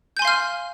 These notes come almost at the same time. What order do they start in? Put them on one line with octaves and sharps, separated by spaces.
G6 G#5 C6 F5 F6